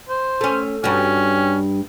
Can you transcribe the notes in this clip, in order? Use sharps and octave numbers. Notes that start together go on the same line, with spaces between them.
C5
A3 C#4
G2 C#4 F#4